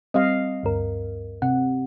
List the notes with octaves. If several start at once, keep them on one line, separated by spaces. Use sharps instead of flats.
G3 C4 D#5 F5
D2 G2 A#4
C3 F#5